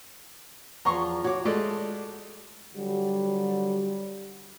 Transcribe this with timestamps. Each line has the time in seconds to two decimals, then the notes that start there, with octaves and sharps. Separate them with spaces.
0.85 E2 F3 A#5 C6 C#6
1.24 F#4 C#5 D6
1.45 G#3 A3 A4 D5
2.75 D3 F#3 G3